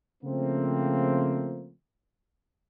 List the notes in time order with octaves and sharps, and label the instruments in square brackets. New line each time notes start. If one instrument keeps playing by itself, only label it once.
[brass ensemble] C#3 F3 A3 A#3 C4